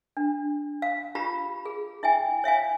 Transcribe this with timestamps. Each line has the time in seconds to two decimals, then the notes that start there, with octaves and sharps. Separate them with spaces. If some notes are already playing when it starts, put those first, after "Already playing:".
0.17 D4
0.82 F5
1.15 F4 G4 A#5 B5
1.66 G#4
2.03 E4 E5 G5 G#5
2.44 C#5 E5 F5 G#5